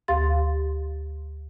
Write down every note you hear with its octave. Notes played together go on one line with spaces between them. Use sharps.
D2 G4 F5 C6 A6